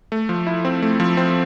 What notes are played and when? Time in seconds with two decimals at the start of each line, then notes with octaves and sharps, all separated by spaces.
0.12 A3
0.29 F3
0.47 E4
0.65 C4
0.82 A3
1.00 F3
1.17 C4